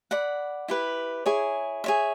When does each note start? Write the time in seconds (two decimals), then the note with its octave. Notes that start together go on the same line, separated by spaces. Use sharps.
0.11 D5 F#5 B5
0.68 E4 G4 B4
1.26 E4 G#4 C#5
1.84 G#4 C#5 E5